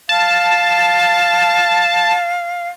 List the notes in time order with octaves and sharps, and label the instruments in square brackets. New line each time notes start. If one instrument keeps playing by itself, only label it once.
[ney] F5 [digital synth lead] A5